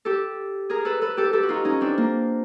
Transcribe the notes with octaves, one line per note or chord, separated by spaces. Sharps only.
G4 A4
G#4 A#4
A4 B4
A4 B4
G4 A4
G4 A4
F#4
D#4 F4
C#4 D#4
C4 D4
A#3